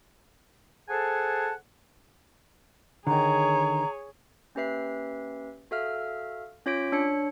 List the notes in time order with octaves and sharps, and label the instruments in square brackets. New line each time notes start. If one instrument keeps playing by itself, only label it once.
[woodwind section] G#4 A4 C5 F#5 G#5 A5
[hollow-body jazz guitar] D3 D#3 [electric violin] G#4 C#5 [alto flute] A#5
[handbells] A#3 C#4 G4 B4 E5 C7
F#4 A4 E5 F5 F6
C#4 F4 C#5 D6 B6 D7
D4 C#5 C#7